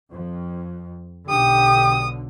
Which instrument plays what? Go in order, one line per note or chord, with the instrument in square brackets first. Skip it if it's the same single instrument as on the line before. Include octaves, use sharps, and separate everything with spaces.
[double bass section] F2
[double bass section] B1 D3 [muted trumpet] G4 [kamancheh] D#6